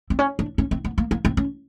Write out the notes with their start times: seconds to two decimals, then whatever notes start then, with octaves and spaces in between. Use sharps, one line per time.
0.10 C4
0.19 C#4
0.39 D4
0.58 C#4
0.71 C4
0.85 B3
0.98 A#3
1.11 A#3
1.25 C4
1.37 C#4